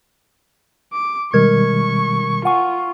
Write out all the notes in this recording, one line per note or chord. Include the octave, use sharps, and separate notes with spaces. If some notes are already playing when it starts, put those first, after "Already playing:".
D6
B2 D#3 G3 G#3 A#4 C#6 G#6
F4 F#5 G#5 C#6